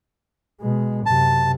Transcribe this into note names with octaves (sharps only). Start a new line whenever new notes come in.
B2 G#3
F#2 C3 A5